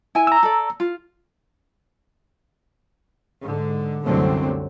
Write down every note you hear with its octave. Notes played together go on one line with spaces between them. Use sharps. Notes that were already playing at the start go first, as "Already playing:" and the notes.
E4 G#5
A#5 E6
A4 D5
F4
G#2 D3
C2 F#2 D3 F#3 A3 C4